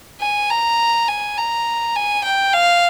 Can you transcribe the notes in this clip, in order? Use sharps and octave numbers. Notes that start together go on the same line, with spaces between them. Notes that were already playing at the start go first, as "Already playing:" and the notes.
G#5
A#5
G#5
A#5
G#5
G5
F5